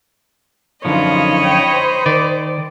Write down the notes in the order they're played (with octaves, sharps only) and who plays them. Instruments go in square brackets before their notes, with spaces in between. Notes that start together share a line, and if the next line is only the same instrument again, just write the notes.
[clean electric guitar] F#2 D3 F3 [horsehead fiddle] D#4 F4 [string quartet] C#5 D#5 B5
[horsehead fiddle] G5
C5
[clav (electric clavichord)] D#3 [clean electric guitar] D5